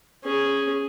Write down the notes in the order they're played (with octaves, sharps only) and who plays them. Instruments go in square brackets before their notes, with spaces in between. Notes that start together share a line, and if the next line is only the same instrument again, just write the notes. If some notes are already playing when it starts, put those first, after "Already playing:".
[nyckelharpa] C#4 G#4